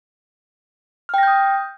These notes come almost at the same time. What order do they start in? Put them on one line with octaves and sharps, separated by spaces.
F6 G5 A#6 G6 D#6